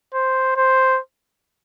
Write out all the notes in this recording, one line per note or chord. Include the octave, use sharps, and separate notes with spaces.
C5
C5